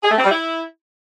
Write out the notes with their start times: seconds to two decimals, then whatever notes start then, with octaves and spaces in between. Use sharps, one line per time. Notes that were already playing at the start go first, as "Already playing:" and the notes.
0.03 G#4
0.10 A3
0.17 C4
0.24 G3
0.30 E4